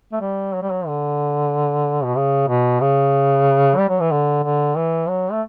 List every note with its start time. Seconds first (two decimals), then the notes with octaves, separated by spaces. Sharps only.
0.12 A3
0.21 G3
0.54 F#3
0.62 G3
0.72 F#3
0.87 D3
2.04 B2
2.17 C#3
2.49 B2
2.81 C#3
3.77 G3
3.89 F#3
4.00 E3
4.12 D3
4.44 D3
4.76 E3
5.08 F#3
5.32 A3